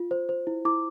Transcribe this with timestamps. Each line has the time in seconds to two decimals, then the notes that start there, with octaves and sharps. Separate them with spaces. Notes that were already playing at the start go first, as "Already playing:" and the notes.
Already playing: F4
0.11 C5
0.29 C5
0.47 E4
0.65 E4 D6